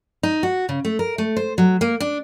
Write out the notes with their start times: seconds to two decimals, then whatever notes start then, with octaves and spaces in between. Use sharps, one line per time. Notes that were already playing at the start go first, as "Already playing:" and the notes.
0.23 D#4
0.43 F#4
0.69 C#3
0.85 A3
0.99 A#4
1.18 A3
1.37 C5
1.58 F#3
1.81 A#3
2.00 D4